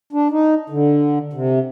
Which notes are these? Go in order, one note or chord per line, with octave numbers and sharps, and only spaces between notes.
D4
D#4
D3
C3